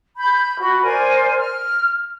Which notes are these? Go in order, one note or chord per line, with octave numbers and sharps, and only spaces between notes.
B5 G6
F#4 B5
A#4 C5 D5 G#5
F6